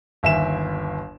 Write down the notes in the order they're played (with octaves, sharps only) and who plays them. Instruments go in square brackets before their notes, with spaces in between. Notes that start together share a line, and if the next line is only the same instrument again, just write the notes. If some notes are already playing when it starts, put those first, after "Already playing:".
[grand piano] G1 D#2 E5 G#5 E7